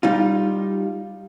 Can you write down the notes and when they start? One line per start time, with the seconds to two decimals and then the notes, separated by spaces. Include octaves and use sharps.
0.03 G3 D#4 F4